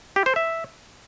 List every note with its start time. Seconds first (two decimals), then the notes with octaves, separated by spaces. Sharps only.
0.16 G4
0.26 C5
0.36 E5